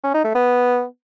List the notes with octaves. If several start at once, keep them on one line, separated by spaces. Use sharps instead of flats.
C#4
D#4
A3
B3